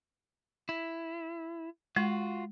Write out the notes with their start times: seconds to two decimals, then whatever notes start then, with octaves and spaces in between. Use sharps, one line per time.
0.69 E4
1.96 G#3 F4 F#4